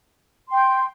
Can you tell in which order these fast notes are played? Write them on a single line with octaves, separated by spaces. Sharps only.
C6 G5 G6